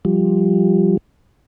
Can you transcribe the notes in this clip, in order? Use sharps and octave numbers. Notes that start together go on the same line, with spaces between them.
F3 G3